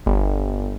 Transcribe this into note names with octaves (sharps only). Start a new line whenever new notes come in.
G1